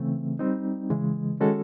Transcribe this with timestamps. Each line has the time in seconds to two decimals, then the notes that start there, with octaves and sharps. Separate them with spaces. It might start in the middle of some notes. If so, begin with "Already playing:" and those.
Already playing: C#3 E3 A3 C4
0.39 G3 C4 D#4
0.90 C#3 E3 G#3
1.40 D#3 G#3 C#4 F#4 A4